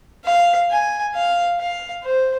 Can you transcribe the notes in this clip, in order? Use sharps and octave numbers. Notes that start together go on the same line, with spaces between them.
F5
G#5
F5
F5
C5